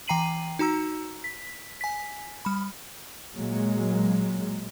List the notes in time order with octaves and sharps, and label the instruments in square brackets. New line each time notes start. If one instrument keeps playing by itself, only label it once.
[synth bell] E3 G5 A#5 C7 D#7 F#7
D#4 F#4 A#5 E6
B6
G#5 B6
G3 B5
[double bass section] A#2 F#3 G#3 A#3